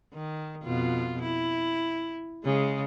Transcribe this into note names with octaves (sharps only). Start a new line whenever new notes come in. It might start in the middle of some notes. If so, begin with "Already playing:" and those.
D#3
F2 B2 F4
E4
C#3 G#3